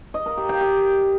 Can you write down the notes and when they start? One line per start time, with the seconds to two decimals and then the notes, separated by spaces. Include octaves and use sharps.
0.14 D#5
0.26 A#4
0.37 G4
0.49 G5
0.61 G4